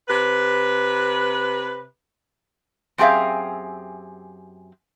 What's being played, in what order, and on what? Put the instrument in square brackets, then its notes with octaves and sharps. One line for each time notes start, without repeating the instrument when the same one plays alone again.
[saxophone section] C3 B4
[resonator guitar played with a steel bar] F#2 C4 G4 G#4 E5 F5